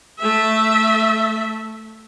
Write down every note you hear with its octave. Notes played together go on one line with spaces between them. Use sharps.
A3 E5